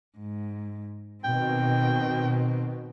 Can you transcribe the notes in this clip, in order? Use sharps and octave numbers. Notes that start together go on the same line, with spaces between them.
G#2
B2 D#3 C4 G5